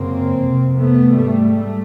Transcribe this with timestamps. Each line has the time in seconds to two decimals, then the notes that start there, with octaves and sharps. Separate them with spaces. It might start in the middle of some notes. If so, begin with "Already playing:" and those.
Already playing: F#2 C#3 A#3 C4
0.38 F2 C3
0.77 A3 B3
1.15 G#2 G3 A3
1.54 A3